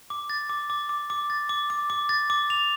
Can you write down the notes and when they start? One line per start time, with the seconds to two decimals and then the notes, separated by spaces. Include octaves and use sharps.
0.10 D6
0.30 A6
0.49 D6
0.70 D6
0.89 D6
1.10 D6
1.30 A6
1.49 D6
1.70 D6
1.90 D6
2.09 A6
2.30 D6
2.50 F7